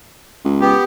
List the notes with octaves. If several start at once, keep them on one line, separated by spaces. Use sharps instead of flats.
C#2
B3 G4